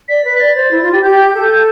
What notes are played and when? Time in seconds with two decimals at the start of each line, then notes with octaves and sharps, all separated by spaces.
0.08 D5 B6
0.24 B4
0.40 D5 A6
0.55 C5
0.71 E4
0.82 F4
0.92 G4
1.03 G4 G6
1.34 A4